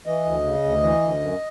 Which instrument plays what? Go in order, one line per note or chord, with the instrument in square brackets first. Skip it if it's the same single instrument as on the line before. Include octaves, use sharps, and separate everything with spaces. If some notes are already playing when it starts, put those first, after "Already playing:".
[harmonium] E3 D#5
D2
C#3
D2
E3
D2
F#2